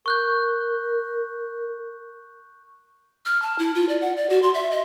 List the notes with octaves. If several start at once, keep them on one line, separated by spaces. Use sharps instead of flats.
A#4 C#6 F#6 G6
F6
A5
E4
F4
D5
F#5
D5
F#4
C6
E5
D#5